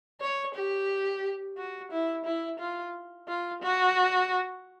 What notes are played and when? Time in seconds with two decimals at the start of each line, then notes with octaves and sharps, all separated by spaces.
0.21 C#5
0.55 G4
1.57 F#4
1.92 E4
2.25 E4
2.59 F4
3.28 F4
3.62 F#4